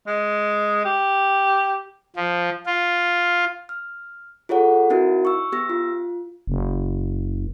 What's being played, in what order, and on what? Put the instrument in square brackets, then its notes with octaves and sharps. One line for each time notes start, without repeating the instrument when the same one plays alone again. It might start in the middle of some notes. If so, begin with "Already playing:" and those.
[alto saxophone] G#3
G4
[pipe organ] F3
F4
[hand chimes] F6
F4 G#4 A4 C#5 F#5
C4 D#4 E4 F#4 A#4
C#6 E6
B3 G4 E6 A#6
F4
[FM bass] F#1